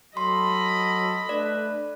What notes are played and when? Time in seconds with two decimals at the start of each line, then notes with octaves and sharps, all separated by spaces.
0.17 F#3 A4 D#5 B5 C6
1.29 A3 D4 B4 D5